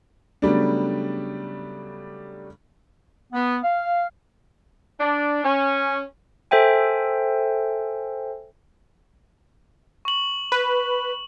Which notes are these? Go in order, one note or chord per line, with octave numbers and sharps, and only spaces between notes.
C#3 F#3 G3 A3 B3 D4
B3
F5
D4
C#4
A4 C5 E5 G5 G#5
C#6 F#7
B4